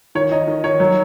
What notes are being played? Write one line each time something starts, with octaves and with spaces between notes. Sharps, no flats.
D#3 C#5
D#3 D#5
D#3
D#3 C#5
F#3